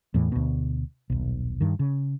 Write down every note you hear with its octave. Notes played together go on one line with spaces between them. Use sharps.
E2 A2 E3
D2 B2
D#1 B1
G2 D#3
C#3